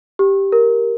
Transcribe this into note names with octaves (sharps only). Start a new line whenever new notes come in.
G4
A#4